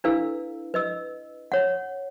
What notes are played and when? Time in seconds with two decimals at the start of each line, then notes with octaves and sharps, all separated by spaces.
0.04 D4 E4 A4 B4 F5 E6
0.74 B4 D#5 E6
1.52 C#5 F#5